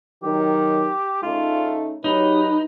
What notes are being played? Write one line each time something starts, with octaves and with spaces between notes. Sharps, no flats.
D#3 F#3 G4
C#3 A3 D#4 F4
F#3 D#4 G4 B4 C#5